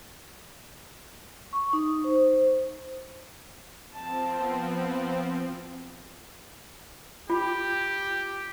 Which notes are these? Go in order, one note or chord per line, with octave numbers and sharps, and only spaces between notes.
C#6
D#4
C5
F3 C4 A5
B3
F4 G4